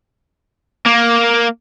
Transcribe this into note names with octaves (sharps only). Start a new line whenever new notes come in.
A#3